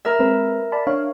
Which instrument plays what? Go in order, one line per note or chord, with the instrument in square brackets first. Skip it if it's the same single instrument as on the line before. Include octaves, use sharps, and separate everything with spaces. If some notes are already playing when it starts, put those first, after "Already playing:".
[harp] A#4 E5
[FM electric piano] G#3 C4 B4
D5 A5 B5
D4 C#5 F5